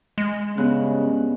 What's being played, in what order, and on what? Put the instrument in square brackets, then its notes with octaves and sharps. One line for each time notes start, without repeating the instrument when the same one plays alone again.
[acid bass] G#3
[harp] G2 B3 F#6 [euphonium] C#3